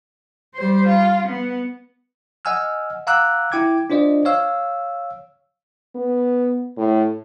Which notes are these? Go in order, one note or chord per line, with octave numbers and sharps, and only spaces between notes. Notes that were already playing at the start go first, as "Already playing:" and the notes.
G3 C5
F4
B3
D#5 F#5 G#5 E6 F6
F5 F#5 A#5 D6 E6 F#6
E4 G5 D6 G#6
D4 F4 C5 D5 D#5
C#5 F5 E6
B3
A2